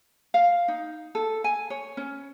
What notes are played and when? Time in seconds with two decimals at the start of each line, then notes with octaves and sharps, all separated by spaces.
0.34 F5
0.68 D#4
1.15 A4
1.44 G#5
1.70 C#5
1.97 C#4